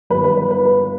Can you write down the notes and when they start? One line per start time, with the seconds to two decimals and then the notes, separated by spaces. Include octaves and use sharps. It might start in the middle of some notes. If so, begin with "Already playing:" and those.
0.10 G1 G2 D#3 B4
0.24 B4
0.37 B4
0.51 B4
0.65 B4